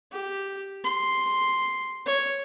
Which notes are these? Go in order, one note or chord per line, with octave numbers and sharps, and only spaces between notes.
G4
C6
C#5